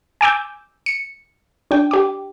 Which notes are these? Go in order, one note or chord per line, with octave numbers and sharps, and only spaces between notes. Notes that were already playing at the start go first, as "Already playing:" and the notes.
G#5 D6 E6 G6
C#7
D4 G5
G4 D6